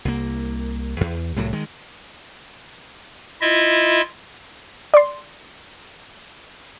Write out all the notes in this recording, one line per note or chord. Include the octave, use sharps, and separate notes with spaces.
C2 A#3
E2
C2 A2 F#3
D#3 G#3
E4 F4 D#5 E5
D5 C6